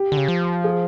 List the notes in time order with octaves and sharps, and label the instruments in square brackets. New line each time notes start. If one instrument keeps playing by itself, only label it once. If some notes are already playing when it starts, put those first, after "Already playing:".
Already playing: [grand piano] G4
[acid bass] D3
C#3
F3
[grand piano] G#4